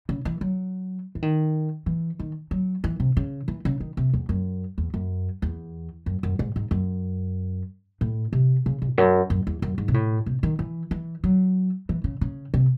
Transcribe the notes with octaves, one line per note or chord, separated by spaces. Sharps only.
C#3
E3
F#3
E3
D#3
E3
D#3
F#3
E3
C3
C#3
E3
C#3
D#3
C3
E2
F#2
E2
F#2
E2
F#2
F#2
G#2
G#2
F#2
A2
C3
C#3
C#3
E2
F#2
F#2
E2
F#2
G#2
C3
A2
C3
D#3
E3
E3
F#3
E3
C#3
C#3
C3